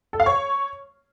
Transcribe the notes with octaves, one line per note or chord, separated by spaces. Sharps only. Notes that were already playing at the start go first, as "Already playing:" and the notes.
A4
F5
C#5